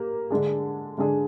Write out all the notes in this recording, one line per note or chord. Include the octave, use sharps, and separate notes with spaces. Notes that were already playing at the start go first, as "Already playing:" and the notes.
Already playing: A#3 G4
D3 G#3 D4 G#4
D3 G#3 D4 G#4